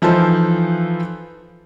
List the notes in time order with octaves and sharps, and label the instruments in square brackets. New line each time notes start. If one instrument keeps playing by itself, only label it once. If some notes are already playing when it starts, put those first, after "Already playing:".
[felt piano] E3 F3 D#4 F4 A4 C5